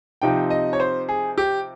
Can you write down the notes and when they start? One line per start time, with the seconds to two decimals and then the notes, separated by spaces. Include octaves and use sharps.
0.22 C3 F3 C4 D#4 G5
0.50 D#5
0.73 C#5
0.80 C5
1.09 G#4
1.38 G4